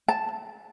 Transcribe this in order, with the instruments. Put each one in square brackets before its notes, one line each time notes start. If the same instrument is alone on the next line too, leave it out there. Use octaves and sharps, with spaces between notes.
[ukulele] A5